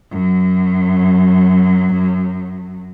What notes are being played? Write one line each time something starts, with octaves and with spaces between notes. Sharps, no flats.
F#2 F#3